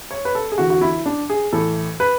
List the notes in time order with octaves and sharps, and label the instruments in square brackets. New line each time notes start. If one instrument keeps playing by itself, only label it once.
[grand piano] C#5
B4
A4
G#4
E2 D3 F#4
F#4
E4
D4
G#4
A2 E3 A4
B4